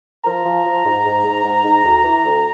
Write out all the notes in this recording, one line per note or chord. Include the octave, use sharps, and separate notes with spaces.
F3 A#5
F3
F3
G#2
G#2
G#2
G#2
G#2
D2
E3
D2